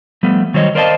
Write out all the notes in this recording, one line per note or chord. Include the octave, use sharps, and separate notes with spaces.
F3 G3 A3 B3
D#3 F#3 G3 C5 C#5 D#5
A#4 C5 D5 D#5 F5 A5